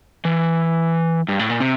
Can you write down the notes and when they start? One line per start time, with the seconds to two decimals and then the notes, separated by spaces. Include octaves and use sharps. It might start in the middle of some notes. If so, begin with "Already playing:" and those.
0.25 E3
1.28 G2
1.39 A2
1.50 A#2
1.60 C3